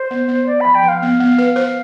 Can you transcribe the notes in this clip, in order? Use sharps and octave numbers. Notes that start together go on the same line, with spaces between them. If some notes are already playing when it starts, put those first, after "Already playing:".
Already playing: C5
B3
B3
B3 D5
F3 B5
G5
F3
F5
B3
B3
B4
C5